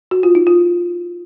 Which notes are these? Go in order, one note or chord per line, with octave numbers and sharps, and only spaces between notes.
F#4
F4
D#4
F4